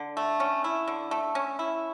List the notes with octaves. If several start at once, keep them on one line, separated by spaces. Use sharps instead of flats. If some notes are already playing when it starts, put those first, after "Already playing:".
Already playing: D3
A3
C#4
E4
D3
A3
C#4
E4